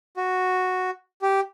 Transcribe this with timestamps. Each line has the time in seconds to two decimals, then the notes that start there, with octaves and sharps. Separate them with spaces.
0.17 F#4
1.22 G4